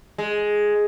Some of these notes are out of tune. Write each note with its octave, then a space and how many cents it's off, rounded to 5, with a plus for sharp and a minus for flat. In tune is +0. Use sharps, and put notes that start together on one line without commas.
G#3 +5